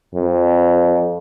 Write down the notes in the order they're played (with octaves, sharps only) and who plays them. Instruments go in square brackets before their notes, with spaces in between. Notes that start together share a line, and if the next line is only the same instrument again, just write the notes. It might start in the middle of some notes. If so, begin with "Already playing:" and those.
[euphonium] F2